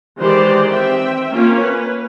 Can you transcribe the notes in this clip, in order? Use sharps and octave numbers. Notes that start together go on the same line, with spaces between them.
D#3 E3 G#3 G4 C5 D5
C4 E5 G5
A#3 C#4 F4
B4